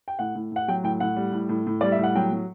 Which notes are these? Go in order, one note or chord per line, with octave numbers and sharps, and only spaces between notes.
G5
A2 F#5
A2
A2 F#5
F#3 G5
A2 G5
A2 F#5
G3
A2
A2
A2
G3 D5
E5
A2 F#5
F#3 G5
F#3